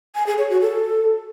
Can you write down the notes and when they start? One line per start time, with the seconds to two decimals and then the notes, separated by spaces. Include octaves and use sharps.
0.15 G#5
0.26 G#4
0.38 C#5
0.50 F#4
0.61 A4